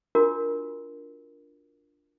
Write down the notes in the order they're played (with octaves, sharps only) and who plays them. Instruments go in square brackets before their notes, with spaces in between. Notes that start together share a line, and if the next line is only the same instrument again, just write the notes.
[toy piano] D4 F4 F#4 A#4